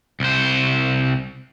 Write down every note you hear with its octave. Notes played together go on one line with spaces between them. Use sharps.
C2 C5